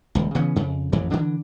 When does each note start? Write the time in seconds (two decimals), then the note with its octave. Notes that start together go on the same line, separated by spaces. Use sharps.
0.15 D#1 C#2
0.35 C#3 E3 B3 C#4
0.56 F2 C#3
0.92 A1 F2 E3
1.12 D3 E3 D4